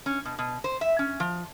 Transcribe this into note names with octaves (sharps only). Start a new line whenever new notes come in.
C#4
B2
B2
C5
E5
C#4
F3